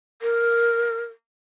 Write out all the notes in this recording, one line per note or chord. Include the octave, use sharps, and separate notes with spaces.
A#4